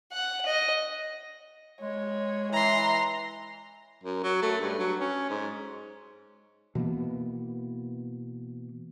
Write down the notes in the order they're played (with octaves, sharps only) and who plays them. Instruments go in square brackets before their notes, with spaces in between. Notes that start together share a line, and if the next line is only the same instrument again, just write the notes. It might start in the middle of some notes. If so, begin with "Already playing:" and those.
[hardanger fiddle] F#5
D#5
[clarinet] G#3 [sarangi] C#5
[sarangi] E3 [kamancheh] A#5 C6
[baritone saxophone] F#2
F#3
A3
G2
F#3
C#4
G#2
[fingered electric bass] B2 E3 A#3 B3